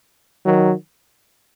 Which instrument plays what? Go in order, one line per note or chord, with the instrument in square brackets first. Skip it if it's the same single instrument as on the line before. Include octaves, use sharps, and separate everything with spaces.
[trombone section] D#3 F#3